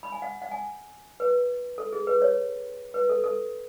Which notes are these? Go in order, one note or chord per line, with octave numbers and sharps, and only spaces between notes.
B5
G#5
F#5
F#5
G#5
B4
A4
G#4
B4
C#5
B4
A4
A4